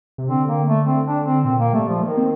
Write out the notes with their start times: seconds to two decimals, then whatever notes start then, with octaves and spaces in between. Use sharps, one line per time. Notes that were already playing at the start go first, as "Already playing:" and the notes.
0.18 C3
0.29 D3 C4
0.49 A#3
0.68 A3
0.87 C4
1.07 D4
1.25 C4
1.44 A#2 C4
1.59 A#3
1.73 G3 A3
1.89 F3
2.03 D#3 A#3
2.17 C4